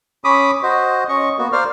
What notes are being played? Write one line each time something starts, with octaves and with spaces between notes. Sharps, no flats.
C#4 B5 D6 D#6
F#4 C5 D#5
C#4 D#5 C#6
A#3 B3 F#4
A#4 C5 D5 F5 F6